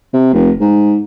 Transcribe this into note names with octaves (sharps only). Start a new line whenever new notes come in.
C3
F1
G#2